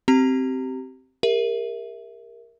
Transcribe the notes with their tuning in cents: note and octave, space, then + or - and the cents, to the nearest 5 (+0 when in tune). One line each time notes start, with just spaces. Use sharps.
C4 +0 G4 -25 A#5 -25
G4 +45 A#4 +0 E5 -5